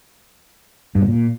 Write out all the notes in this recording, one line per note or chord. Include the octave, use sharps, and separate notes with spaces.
G2
B2
A#2